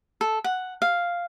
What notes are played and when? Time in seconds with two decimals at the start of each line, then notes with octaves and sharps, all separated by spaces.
0.21 A4
0.44 F#5
0.82 F5